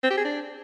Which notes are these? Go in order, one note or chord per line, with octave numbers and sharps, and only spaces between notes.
C4
G4
G#4
D4